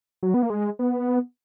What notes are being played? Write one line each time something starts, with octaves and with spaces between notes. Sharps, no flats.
F#3
B3
A#3
G#3
B3